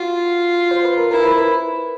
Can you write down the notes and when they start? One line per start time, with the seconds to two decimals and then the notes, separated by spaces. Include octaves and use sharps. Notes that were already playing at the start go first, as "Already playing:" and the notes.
Already playing: F4 F#4
0.71 C5
0.85 B4
0.97 A#4
1.11 E4 A#4
1.24 A#4
1.38 B4